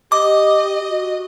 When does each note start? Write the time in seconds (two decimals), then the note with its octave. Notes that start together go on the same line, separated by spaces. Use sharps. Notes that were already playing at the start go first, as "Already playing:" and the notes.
0.12 G4 D#5 D6
0.89 F#4